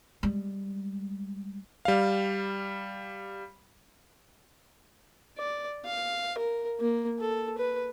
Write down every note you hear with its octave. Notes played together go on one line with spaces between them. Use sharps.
G3 G#3
G3 F5
D5
F5
A#4
A#3
A4
B4